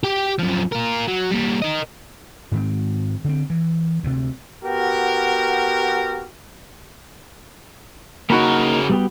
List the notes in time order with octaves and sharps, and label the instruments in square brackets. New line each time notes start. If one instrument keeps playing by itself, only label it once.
[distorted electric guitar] G4 G5
F#2 F3
F4 A#4
F#3
G3 A#3
A#4 D#5
[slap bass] G#2 D#3 C4
D3 C4
E3
D2 C3
[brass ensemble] B3 F#4 G4 A#4
[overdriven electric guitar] C#3 A#4 [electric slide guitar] A#3 D#4 [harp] F#4 B5
[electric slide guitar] G3 B3 G4